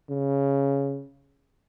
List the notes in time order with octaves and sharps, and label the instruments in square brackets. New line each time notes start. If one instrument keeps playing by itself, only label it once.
[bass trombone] C#3